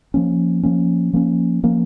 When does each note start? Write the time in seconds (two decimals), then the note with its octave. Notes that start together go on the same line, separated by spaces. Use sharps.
0.14 F3 A#3 C#4
0.63 F3 A#3 C#4
1.13 F3 A#3 C#4
1.63 F3 A#3 C#4